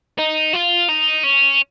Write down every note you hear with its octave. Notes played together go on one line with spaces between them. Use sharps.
D#4
F4
D#4
C#4